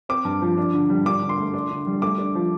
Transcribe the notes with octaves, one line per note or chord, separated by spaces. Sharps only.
C4 D6
G2
F3
D4
D3
G3
D4 D6
D3
C6
A3
D4
D3
G3
A3 D6
D4
F3